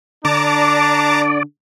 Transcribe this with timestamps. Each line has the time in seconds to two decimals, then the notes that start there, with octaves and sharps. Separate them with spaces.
0.25 D3 D4 D5 A5 A#5 D6